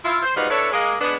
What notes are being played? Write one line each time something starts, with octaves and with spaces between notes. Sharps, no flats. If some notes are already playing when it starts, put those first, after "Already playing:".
E4 F4
C5
G#2 B2 G3 B3 D#4 F4
D4 E4 A4 B4 C#5
G#3 A#3 G#4
G#3 B3 D4